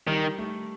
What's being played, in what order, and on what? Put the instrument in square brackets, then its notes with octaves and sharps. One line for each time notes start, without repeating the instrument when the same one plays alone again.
[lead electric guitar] D#3 [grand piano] G3
[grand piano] A3